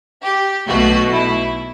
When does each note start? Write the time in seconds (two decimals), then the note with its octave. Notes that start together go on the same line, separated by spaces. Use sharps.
0.23 G4
0.66 B1 B2 A3 F#4
1.10 E4